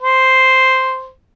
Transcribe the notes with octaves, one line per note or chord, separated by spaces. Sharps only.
C5